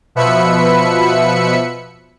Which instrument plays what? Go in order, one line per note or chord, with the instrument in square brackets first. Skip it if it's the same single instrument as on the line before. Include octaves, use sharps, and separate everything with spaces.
[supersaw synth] B2 F3 B4 E5 B5 C#7